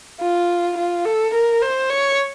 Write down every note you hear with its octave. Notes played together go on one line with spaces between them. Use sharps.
F4
F4
A4
A#4
C5
C#5